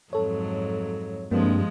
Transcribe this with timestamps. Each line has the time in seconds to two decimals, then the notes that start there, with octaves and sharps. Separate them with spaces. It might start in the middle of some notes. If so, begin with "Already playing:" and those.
0.13 F2 G#2 F#3 A4 C#5
1.31 G2 F3 G#3 A#3 C4